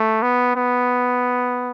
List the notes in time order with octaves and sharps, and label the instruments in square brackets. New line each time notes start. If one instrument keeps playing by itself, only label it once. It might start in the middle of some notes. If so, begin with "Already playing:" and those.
Already playing: [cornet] A3
B3
B3